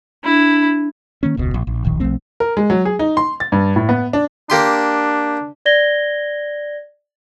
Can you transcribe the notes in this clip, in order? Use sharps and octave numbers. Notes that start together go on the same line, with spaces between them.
D4 E4
D#3 A#3 C#4
E1 C#2 B2
A#1
A#1
D1 A#1 D#3
B1 F3 A3 C4
A#4
G#3
F#3
G#4
D#4
C6
A6
G2
A2
B3
D4
A#3 D4 G4 C6
D5 G#6 A#6 G7